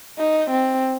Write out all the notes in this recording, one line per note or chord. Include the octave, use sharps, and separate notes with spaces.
D#4
C4